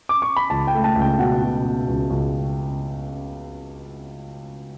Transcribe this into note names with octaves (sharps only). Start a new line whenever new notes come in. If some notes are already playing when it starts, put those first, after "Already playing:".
D6
C#6
B5
C#2 A5
G5
A3
A5
C#2
G5
B2 F#5
B2
B2
C#2
C#2